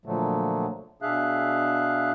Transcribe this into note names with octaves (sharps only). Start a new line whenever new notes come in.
A#2 D3 F3 F#3 A3
B2 D4 G#4 E5 F5 F#6